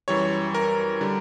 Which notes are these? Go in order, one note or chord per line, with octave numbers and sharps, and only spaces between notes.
F#2 E3 G3 C#5
A#4
D3 G3